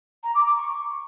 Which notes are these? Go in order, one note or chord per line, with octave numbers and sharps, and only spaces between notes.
A#5
D6
D6
C#6